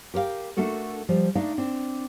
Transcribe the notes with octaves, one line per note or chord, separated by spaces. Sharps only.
G4 A#4 B4 F5 G5
A3 D4 F#4 A4 A#4
F3 G3
A3 D4 D#4 D5 F5
C4 D4